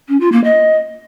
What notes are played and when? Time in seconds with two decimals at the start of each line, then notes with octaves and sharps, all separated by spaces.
0.09 C#4
0.20 F4
0.32 A#3
0.44 D#5